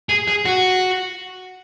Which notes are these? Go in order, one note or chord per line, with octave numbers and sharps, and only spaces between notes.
G#4
G#4
F#4